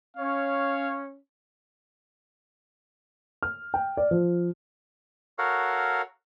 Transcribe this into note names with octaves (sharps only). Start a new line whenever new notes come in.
C#4 C#5 F5
F6
G5
D5
F3
F#4 A4 A#4 C#5 F5 F#5